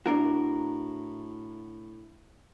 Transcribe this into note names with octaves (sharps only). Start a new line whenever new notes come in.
A2 D4 E4 F#4 A#4